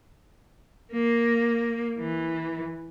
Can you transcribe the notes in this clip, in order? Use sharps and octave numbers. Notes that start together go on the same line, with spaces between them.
A#3
E3